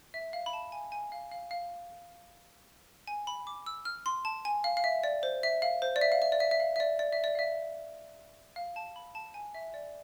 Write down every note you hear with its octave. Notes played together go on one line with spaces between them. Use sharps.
E5
F5
B5
A5
G#5
G#5
F5
F5
F5
G#5
B5
D6
E6
F6
C6
A5
G#5
F5
F5
E5
D5
C5
E5
F5
C5
D5
E5
F5
E5
D5
E5
E5
F5
E5
D5
D5
E5
D5
F5
E5
F5
A5
B5
A5
G#5
E5
D5